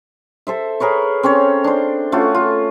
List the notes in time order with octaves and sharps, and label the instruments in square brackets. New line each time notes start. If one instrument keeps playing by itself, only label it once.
[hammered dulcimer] A4 C5 E5
G#4 A#4 B4 C#5
C4 C#4 A4 C#5
D4 C5
A3 C#4 F4 F#4
F4